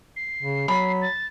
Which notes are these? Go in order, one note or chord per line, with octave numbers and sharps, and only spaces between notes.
C7
C#3
F#3 B5
A6